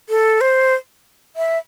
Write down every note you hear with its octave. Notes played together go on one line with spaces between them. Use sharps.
A4
C5
E5